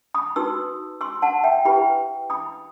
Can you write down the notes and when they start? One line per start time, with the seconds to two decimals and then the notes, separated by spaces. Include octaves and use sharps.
0.14 B5 D#6
0.36 D#4 F#4 B4 C6 E6
1.01 C6 E6
1.22 F#5 A5
1.44 E5 G5
1.65 E4 G4 B4 G5 B5
2.30 B5 D#6